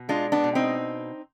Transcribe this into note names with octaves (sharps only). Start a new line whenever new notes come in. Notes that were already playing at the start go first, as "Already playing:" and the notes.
Already playing: B2
G#3 D4 F4
B3 D4
B2
C4 D#4